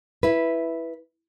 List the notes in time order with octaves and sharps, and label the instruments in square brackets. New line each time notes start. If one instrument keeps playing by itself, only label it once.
[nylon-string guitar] E4 B4